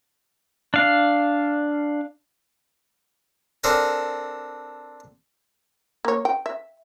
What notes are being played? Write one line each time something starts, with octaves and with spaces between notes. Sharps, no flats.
D4 F5
C4 D4 A4 A#4 G#5
A#3 C#5
G5
E5